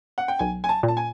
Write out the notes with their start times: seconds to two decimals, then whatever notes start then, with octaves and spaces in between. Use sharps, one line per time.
0.18 F#5
0.28 G5
0.39 B1 G#5
0.64 G#5
0.69 A5
0.83 A#2
0.88 A5
0.97 G#5